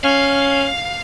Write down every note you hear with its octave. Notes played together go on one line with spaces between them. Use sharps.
C#4 F5